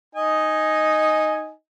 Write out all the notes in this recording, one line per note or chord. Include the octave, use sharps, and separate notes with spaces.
D#4 D#5 G#5